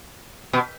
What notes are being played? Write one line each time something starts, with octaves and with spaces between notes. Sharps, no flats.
B2